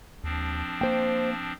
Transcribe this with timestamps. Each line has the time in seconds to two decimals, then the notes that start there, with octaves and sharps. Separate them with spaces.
0.24 D#2 F3 C4 D4
0.81 A#3 C5 G5